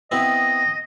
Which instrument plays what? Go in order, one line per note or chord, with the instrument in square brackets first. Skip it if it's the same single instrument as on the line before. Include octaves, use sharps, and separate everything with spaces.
[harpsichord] B3 C4 E4 [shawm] D#5